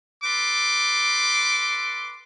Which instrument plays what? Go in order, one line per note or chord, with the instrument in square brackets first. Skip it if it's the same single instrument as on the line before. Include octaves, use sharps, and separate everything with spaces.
[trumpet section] A4 B4 C6 D6